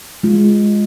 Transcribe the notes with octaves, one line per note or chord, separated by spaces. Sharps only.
G#3 F4